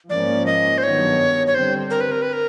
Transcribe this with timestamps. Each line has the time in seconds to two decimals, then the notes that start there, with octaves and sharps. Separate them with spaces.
0.10 G#2 F3 A#3 C#4 D5
0.46 D#5
0.78 C5
0.82 G2 D#3 F#3 B3 C#5
1.47 C#5
1.54 D3 G3 C4 C5
1.90 A#4
2.01 B4
2.12 A#4
2.22 B4
2.33 A#4